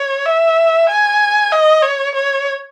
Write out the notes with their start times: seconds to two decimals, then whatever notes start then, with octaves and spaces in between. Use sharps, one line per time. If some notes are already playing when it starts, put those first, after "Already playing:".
Already playing: C#5
0.25 E5
0.89 G#5
1.52 D#5
1.82 C#5
2.15 C#5